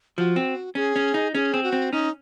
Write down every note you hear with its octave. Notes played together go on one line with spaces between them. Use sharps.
F3 F#4
C4
C#4 G#4
C#4
D#4
C#4 G#4
C4
F#4
C4
C#4 D#4